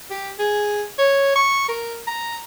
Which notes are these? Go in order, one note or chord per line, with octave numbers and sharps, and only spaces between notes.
G4
G#4
C#5
C#6
A#4
A#5